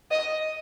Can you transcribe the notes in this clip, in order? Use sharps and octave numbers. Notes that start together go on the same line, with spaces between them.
D#5